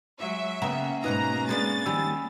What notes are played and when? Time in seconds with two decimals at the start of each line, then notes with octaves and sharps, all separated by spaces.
0.20 F#3 G#3 E5
0.62 C#3 A#3 B3 C#4 F#5 G5 A#5
1.04 G#2 B2 D#4 B4 D#5 A#5 F#6
1.49 G#3 B3 D4 A6
1.86 D#3 F3 G3 G#5 B5 E6